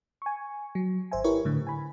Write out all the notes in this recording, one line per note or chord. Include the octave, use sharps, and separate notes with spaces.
G#5 C#6
F#3
G#1 C5 E5 G#5
E4 G4 A#4 B4 C#5 C#6
A2 D3
G#5 B5